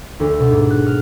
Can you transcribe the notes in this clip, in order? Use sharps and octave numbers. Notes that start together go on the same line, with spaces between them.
D2
B2
G#2
F#6
F6